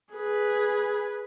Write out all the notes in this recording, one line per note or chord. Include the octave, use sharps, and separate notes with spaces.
G#4 B4